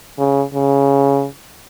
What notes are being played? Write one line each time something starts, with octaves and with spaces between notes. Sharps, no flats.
C#3
C#3